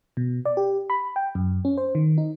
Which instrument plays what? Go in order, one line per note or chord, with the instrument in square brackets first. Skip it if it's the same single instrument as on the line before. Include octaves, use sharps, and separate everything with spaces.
[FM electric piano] B2
D5
G4
B5
G5
F#2
C#4
C5
D#3
D#4